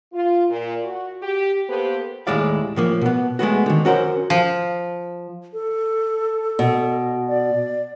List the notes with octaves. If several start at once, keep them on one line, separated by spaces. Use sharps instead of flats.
F4
A#2
F#4
G4
A#3 B3 G4 A4 B4 C5
D#2 A2 G#3 E4 D5 F5
A2 F3 A#3
B2 B3
G#3 A3 B3 F#4
D3 D#3
C#4 F#4 A#4 C5
F3
A4
B2
D5